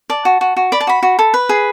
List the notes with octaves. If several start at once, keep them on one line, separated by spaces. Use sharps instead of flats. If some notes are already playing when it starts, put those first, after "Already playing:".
D5 A5
F#4
F#4
F#4
D5 B5
A5
F#4 B5
F#4
A4
B4
G#4